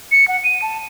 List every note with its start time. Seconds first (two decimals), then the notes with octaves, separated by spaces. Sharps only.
0.12 C#7
0.28 F#5
0.44 D#7
0.62 A5